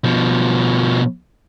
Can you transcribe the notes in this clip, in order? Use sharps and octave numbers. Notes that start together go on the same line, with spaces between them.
B2 F3